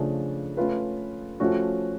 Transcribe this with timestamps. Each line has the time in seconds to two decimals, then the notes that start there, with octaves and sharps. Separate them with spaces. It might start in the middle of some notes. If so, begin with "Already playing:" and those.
Already playing: C#3 F3 A3 D4 G#4
0.57 A3 C#4 F4 B4
1.40 F3 A3 C#4 F#4